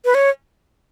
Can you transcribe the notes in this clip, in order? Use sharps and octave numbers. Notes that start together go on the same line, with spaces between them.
B4
C#5